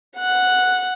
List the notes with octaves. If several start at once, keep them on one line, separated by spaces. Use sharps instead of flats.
F#5 F#6